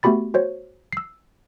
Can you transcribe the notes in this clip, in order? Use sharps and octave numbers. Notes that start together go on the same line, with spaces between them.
A3 B3 F#4 G4 B5 A6
F#4 C5 C#5
E6 C7